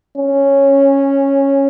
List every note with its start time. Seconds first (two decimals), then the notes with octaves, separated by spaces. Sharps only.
0.18 C#4